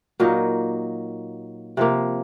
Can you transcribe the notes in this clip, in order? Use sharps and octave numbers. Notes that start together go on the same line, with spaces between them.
A#2 F#3 A#3 D#4
C3 F3 A#3